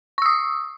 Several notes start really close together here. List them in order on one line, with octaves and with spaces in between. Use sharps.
C#6 E6 D#6